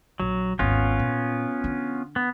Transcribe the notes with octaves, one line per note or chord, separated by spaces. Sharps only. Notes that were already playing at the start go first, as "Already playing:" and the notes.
A#1 F#3
G#1 D#2 B3 C#4 F4
A#2
D3
B3